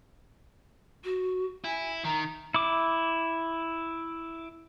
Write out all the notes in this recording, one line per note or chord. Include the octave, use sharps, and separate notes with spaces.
F#4
E4 G#5
D#3 A#5
E4 D6